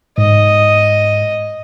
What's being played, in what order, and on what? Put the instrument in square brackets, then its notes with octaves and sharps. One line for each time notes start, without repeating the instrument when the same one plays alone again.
[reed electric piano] G#2 [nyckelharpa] D#5